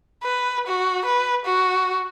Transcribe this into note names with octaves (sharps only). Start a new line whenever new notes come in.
B4
F#4
B4
F#4